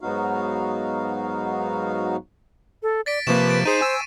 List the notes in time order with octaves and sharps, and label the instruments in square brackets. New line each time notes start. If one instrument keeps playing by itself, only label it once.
[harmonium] G#2 F#3 B3 D#4 F#4 F5
[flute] A4
[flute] D5 [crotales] A6 B6 D7
[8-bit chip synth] C3 F3 A#3 [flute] B4 [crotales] C#6 E7
[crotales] C#6 A6 D7
[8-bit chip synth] D#4 G#4 [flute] C5 [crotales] C7 D#7
[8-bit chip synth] G#5 E6